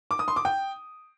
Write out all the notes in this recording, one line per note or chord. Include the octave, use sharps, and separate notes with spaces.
D6
D#6
C6
D6
G5